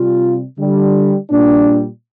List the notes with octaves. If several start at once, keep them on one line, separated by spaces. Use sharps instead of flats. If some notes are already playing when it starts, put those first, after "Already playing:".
Already playing: C3 G3 F4
D3 G3
A#2 G3 D4